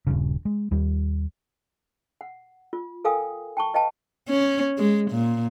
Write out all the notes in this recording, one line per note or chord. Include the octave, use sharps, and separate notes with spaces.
D#1 G2 C#3
G#3
D#2 G3
F#5
F4
A4 A#4 F5 G5 G#5 D#6
G5 A5 C#6
B4 D#5 F5 G5 A5
C#4
G#3
A#2